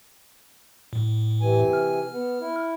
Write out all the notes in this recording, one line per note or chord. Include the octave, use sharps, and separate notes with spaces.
A2
C3 E3 G#5
F6
B3
E4